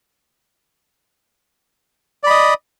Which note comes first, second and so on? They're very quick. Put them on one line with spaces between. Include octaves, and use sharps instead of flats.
D5 B5 D#5